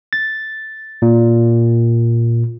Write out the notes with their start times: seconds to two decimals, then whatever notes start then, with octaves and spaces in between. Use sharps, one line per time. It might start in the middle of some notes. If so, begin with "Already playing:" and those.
0.13 A6
1.02 A#2